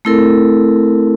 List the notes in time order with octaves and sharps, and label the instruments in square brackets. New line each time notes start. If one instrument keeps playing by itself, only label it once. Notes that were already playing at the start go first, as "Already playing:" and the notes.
[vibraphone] A3 C4 E4 A4 A#4